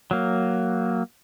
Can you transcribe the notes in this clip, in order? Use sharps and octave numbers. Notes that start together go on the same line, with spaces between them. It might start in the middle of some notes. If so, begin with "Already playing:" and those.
F#3 A#3